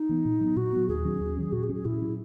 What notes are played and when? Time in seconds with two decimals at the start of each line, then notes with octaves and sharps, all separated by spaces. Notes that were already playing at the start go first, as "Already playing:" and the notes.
Already playing: D#4
0.09 E3 B3
0.25 A#2
0.40 F#3 B3
0.56 A#2 F#4
0.72 F#3 B3
0.89 D#2 G#4
1.05 D#3 F#3 C#4
1.21 D#2
1.37 D#3 F#3 C#4
1.52 A#2 F#4
1.64 G#4
1.69 F#3 C#4
1.75 G#4
1.85 A#2 E4
2.01 F#3 C#4